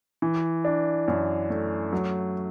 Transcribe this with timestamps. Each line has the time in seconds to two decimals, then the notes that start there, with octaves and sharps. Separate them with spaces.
0.22 E3
0.65 D4
1.08 F#2
1.50 A3
1.93 F#3